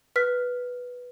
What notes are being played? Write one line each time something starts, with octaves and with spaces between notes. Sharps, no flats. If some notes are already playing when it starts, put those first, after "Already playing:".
B4 F6 B6